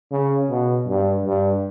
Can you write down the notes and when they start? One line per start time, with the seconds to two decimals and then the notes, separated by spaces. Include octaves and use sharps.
0.11 C#3
0.50 B2
0.87 G2
1.24 G2